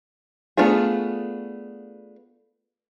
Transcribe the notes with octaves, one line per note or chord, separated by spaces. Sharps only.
A3 B3 D4 F4 G#4